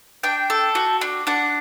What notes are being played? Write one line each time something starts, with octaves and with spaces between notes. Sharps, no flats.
D4 G5
A4
F#4
D4
D4 F#5